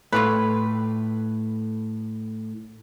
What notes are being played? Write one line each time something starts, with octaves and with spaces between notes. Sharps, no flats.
A2 A3 F4 G4 B4